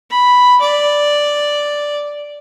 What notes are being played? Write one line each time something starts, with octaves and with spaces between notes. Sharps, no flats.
B5
D5